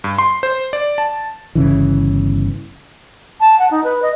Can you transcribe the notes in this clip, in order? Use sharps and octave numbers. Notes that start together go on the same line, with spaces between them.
G2
C6
C5
D5
A5
G1 C#3 E3
A5
F#5
D#4
B4
D#5